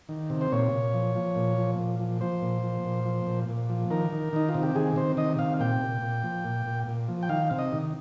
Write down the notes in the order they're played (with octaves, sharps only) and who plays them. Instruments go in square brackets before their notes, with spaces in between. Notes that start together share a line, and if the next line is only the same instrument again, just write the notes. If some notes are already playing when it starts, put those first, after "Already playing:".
[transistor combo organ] D#3
C3
C5
A#2 C#5
A#2
F3
F3
A#2
F3
A#2
F3
F3 C5
A#2
F3
A#2
F3
A#2
A#2
F3
D#3 A#4
D#3
D#3 D#4
F4
C3
G4
D#3 G#4
C3 C5
D#3 D#5
C3 F5
A#2 G5
A#2
A#2
F3
A#2
A#2
A#2
F3
G5
D#3 F5
C3
D#5
D#3